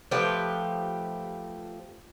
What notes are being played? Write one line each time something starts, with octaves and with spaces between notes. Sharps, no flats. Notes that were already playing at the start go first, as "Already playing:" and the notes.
F3 A3 G4 B4